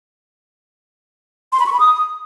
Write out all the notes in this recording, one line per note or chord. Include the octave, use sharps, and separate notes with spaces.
C6
B5
C#6
B5
D#6